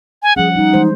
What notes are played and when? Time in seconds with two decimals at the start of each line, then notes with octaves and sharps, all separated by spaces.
0.23 G#5
0.36 F3 G3 C#4 G#4 F#5
0.55 F3 G3 D#4
0.74 E3 G#3 C5